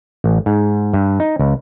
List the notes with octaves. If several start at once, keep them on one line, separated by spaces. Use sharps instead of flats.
A1
G#2
G2
D#4
C#2